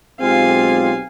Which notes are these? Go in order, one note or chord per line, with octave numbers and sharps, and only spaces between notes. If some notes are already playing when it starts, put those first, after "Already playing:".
B1 G#3 C4 F4 G4 F5 G#5